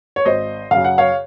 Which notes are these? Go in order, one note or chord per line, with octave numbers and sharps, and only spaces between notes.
C#5
G#1 C5 D#5
F#2 C#3 F5
F#5
C#5 F5